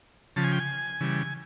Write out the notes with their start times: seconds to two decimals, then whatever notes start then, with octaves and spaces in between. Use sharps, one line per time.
0.36 C#3 F3 A5
0.44 G#5
0.52 G5
0.59 G#5
1.00 C#3 E3 G3